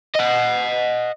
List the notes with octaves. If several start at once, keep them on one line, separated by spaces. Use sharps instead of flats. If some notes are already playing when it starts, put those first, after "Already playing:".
D#5 F#5